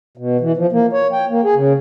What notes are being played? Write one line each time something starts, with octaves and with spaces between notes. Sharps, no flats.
B2
E3
F3
A#3
C#5
G5
A#3
G#4
C#3